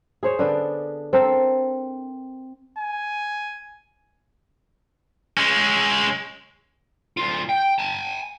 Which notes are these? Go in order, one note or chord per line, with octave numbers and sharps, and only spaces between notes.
G#4 C5 C#5
D3 B3 D4
C4 A4 A#4
G#5
G#3 C#4
D2 F4
G5
G#5 A5